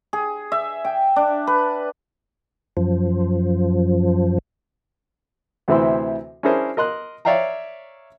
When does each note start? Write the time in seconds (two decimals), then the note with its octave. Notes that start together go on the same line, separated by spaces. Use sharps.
0.13 G#4
0.52 E5
0.85 G5
1.16 D4
1.47 B4
2.77 F#2 F3
5.68 D2 C3 E3 C4 E4 C6
6.43 C#4 D4 E4 G#4 A#4 C5
6.77 A#4 D#5 C6 F#6
7.25 C#5 D5 E5 F5 G5 A#5